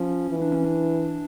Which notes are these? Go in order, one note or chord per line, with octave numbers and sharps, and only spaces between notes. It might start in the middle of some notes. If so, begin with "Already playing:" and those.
Already playing: F3 C#4
E3
D4
C#4
D4